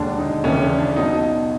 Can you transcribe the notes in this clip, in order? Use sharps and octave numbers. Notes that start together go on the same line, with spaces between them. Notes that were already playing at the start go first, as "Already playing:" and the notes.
Already playing: E1 D#2 D3 D4
D#4
D#2 C#3 E3 C#4
D4
D4
B1 B2 F#3 D#4